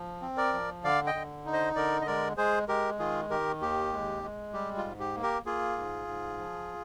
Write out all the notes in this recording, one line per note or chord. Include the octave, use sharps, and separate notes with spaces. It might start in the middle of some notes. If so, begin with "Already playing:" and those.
Already playing: F3
C4
A#4 D5
F3
D3 D5 F5
D#5 G5
D3
D#4
C5 D#5
D3 A#4 D5
D#5
G#3 A#4 D5
G#3 G#4 C5
G#3 G4 A#4
D#3 F4 G#4
D#3 G4 A#4
D#2 G4
G#3
G#3
G3 G4
F4
G#2
G4
A#3
G4 A#4
A#3 F4 G#4
G#2
G#2
F3